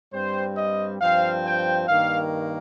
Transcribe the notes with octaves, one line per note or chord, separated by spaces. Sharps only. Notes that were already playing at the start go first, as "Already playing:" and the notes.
G2 G3 C4 C5
D#5
G2 F3 C4 F5
G5
G2 D#3 A#3 F5